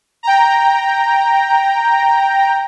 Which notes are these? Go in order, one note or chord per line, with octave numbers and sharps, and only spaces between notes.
G5 A#5